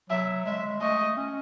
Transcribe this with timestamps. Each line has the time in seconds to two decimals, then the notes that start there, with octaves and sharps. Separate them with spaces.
0.10 F#3 E5
0.46 G#3 E5
0.82 A3 D#5
1.17 C#4